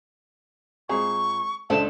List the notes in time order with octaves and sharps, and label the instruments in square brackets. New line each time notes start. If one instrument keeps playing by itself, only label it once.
[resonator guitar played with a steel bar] A#2 [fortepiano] G#3 C4 G#4 [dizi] C#6
[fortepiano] C#2 C5 E5 [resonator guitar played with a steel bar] G#3 A3 D4 [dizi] A5